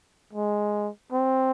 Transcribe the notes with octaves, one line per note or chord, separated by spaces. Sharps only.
G#3
C4